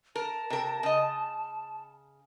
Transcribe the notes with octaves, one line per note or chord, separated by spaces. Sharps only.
A#4 A5
C3 A#4
C#3 D#5